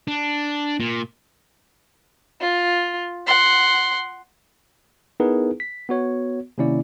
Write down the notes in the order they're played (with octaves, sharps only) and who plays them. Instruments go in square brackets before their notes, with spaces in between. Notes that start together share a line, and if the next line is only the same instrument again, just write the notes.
[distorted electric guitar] D4
A#2
[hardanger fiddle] F4
F#5 C6
[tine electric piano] B3 D#4 E4 G#4 A#4 B4
B6
B3 F#4 C#5
C3 D#3 A#3 C#4 E4 D5